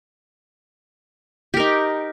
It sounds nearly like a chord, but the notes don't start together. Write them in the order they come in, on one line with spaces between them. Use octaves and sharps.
G4 A#4 D#4